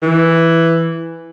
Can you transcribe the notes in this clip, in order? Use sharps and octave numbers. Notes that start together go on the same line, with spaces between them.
E3